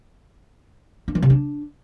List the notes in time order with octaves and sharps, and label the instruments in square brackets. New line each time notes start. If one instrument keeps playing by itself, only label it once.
[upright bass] D4
E3
C3
D4